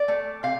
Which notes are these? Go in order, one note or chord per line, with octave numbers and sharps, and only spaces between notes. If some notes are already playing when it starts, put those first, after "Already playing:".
Already playing: D5
A3
C3 F5